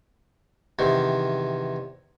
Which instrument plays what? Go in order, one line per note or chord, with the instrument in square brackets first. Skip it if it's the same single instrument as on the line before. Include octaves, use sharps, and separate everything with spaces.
[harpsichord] E2 C3 D#3